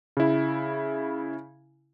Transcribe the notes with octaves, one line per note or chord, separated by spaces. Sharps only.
C#3 E4